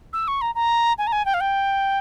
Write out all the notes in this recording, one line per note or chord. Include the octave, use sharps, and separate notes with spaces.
E6
C#6
A#5
A#5
G#5
A#5
G#5
G5
F5
G5